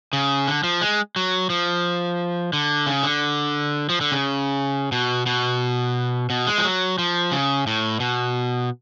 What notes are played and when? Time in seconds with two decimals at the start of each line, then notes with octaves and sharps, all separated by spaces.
0.13 C#3
0.48 D3
0.64 F3
0.82 G#3
1.16 F#3
1.50 F3
2.53 D3
2.87 C#3
3.03 D3
3.89 F3
4.01 D3
4.12 C#3
4.92 B2
5.26 B2
6.30 B2
6.47 G#3
6.58 F3
6.64 F#3
6.98 F3
7.32 C#3
7.67 A2
8.00 B2